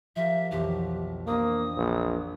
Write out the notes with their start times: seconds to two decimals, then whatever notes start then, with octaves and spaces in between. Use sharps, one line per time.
0.16 F3 G4 A#4 E5
0.51 B1 F2 E3 G4
1.27 A#3 C4 D4 D#5 D#6
1.77 A#1